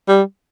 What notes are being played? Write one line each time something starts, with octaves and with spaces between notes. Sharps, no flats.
G3